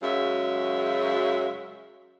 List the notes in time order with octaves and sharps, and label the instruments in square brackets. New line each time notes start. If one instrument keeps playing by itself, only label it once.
[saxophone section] F#2 C#3 F#3 G#3 E5